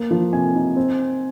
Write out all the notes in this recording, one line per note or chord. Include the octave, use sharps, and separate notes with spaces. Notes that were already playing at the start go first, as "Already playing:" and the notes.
Already playing: A#3
F3
C3 G#5
D#4
C4